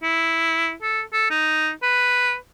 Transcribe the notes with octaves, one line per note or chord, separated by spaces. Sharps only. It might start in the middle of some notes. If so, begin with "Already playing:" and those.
E4
A4
A4
D#4
B4